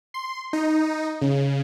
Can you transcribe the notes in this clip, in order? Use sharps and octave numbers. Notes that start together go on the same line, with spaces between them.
C6
D#4
C#3